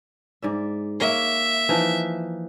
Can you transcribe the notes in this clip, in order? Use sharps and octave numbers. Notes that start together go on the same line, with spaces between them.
G#2 D5 E5
A#3 C#5 E5
E3 F3 D#4